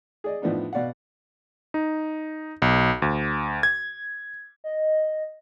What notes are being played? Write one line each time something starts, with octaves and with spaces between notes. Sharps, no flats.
G#4 D5 D#5
A2 F3 B3 D4 D#4
B2 D5 F5 F#5
D#4
B1
D2
G#6
D#5